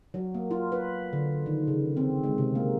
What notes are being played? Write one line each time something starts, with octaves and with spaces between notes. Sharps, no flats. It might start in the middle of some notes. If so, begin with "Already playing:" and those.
F#3
A#3
F4
B4
D3
D#3
C#3
C4
G#3
C3
A#3